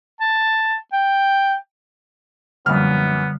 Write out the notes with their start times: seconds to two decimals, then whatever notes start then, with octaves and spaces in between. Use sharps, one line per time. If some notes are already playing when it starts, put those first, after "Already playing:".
0.20 A5
0.93 G5
2.66 A#1 F#2 D3 G3 B3 F6